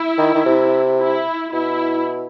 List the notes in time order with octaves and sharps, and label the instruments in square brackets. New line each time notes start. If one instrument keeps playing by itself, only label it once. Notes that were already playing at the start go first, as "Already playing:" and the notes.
Already playing: [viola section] E4
[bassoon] D#3
D#3
C3
[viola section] E4
[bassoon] B2 [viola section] E4